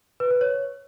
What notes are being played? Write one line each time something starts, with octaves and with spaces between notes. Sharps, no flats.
B4
B4
C#5